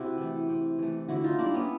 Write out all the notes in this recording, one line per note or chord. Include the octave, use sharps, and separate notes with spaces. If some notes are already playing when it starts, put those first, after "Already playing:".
Already playing: C3 E4 F#4
E3 A3
C3
E3 A3
D3 E4 F#4
D#4 F4
G3 A#3 D4 E4
B3 C#4